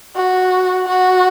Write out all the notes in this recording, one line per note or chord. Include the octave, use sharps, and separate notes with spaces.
F#4
F#4